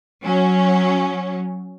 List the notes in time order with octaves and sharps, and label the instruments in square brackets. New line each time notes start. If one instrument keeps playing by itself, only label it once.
[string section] F#3 C#4